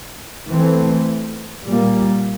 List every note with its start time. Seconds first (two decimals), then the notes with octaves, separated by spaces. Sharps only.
0.51 E3 A3 C4
1.63 A#2 G3 A#3